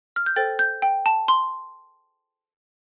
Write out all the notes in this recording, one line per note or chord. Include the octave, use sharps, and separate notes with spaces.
F6
G6
A4 C5 G5 A6
G6
G5
A5
C6